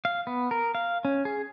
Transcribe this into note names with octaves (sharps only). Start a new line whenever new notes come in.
F5
B3
A#4
F5
C#4
G#4